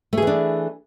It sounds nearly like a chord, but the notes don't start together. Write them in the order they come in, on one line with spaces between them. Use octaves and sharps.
A3 G#4 E3 D4